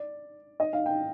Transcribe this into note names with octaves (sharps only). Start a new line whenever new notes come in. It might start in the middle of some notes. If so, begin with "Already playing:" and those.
Already playing: D5
D#5
F5
G5